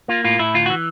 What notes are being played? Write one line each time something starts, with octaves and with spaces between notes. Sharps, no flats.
A#3 F4
A2 F4
A2 E4
D2 F4
F#4
E3